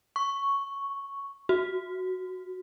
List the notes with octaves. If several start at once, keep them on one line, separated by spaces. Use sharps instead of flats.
C#6
F#4